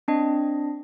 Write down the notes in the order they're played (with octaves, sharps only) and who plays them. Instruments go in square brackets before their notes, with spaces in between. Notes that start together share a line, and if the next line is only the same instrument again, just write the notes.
[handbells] C4 D4 D#5